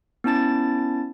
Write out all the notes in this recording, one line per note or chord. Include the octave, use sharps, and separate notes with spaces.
B3 C#4 E4 A5 A6